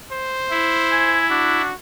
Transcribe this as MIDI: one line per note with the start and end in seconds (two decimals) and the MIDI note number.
0.12 1.22 72
0.50 1.62 64
0.91 1.27 80
1.30 1.69 62
1.30 1.74 66